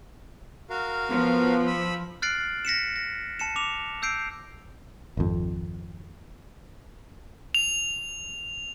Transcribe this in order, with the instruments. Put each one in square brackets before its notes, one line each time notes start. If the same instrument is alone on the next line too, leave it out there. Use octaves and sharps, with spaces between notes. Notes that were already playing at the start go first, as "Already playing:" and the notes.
[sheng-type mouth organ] F#4 A#4 F5
[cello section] F3 [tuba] B3
[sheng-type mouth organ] B5 E6
[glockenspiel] F6 F#6 A6 C7 D7 F#7
A#6 B6 C#7 E7
A#6
A5 C#7 E7
D6 F7
E6 G6 C7 D7
[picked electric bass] G#1 F2
[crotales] F7